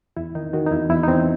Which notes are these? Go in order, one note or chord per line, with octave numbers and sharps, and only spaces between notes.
E2 E4
D#3 D#4
D#3 F#4
D#4
E2 E4
E2 E4
D#4
E2 C4